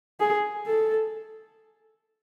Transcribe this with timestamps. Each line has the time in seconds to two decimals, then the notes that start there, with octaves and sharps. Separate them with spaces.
0.20 G#4
0.67 A4